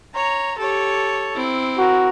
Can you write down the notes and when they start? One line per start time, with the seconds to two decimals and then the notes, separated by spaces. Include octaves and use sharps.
0.15 C#5 A#5
0.59 G4 A4 C#5
1.36 C4 E4
1.78 F#4 A#4